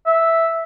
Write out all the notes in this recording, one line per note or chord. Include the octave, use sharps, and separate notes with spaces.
E5